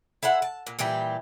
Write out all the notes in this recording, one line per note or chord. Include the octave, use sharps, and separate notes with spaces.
E4 A4 C5 F#5
A5
A#2
A#2 E3 G3 G4